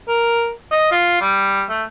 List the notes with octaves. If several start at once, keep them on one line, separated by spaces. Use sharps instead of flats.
A#4
D#5
F4
G3
A3